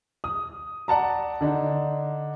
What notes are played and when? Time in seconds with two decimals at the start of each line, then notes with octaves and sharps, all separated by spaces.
0.24 D#6
0.88 D5 F#5 A5 A#5
1.41 D3 D4 D#4